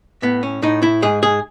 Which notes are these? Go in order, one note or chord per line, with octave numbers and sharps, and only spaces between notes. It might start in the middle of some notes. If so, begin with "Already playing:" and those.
A2 B3
C#4
A2 D#4
E4
G#2 G#4
G#4